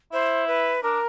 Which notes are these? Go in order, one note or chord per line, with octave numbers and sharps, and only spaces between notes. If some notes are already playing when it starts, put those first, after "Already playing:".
E4 C5
B4
D4 A#4